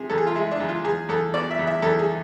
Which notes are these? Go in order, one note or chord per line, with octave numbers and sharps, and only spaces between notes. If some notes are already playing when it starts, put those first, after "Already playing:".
Already playing: C3 G#4
E2 A4
G#4
F4
G#3 E4
D4
E2
F4
E2 G#4
E2 A4
B2 D5
E5
E2
E5
E2 A4
G#4